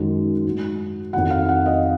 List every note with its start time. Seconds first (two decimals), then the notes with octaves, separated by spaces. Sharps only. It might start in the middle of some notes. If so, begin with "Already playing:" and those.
Already playing: F#2 D#3 G#3
0.45 G#2 F#3
1.13 F2 D#3 F#3 F#5
1.30 F5
1.49 F#5
1.66 D#5